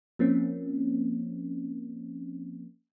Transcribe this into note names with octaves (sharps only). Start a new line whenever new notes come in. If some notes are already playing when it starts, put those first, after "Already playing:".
F3 A#3 C4 C#4